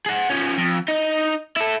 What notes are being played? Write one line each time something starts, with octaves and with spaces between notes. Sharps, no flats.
G#4 F#5
F3 C#4
F2
D#4 D#5
E4 A4